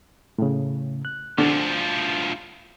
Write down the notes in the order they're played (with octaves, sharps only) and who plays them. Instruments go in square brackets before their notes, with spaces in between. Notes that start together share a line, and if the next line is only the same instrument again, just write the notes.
[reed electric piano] A2 C#3
F#6
[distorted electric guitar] D2 F3 [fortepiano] D3